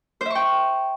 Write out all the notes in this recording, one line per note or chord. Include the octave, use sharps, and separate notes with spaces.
C5 E5 G5 C#6